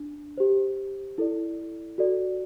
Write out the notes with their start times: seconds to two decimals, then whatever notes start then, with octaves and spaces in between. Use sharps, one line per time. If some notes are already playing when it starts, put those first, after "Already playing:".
Already playing: D4
0.37 G4 C5
1.18 E4 A4 D5
1.98 F#4 A4 D5